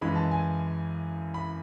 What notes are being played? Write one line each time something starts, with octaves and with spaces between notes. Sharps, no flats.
F#2 C#3 E3 G#3 B5
A5
G#5
B5